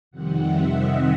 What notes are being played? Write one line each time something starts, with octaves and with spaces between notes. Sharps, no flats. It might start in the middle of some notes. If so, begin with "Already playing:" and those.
F2 C3 D#3 G3 C4 F#5
E5
D#5